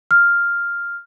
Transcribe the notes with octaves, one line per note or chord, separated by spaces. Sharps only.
F6